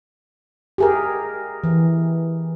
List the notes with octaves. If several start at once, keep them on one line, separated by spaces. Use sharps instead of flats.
G4 G#4 A#4
E3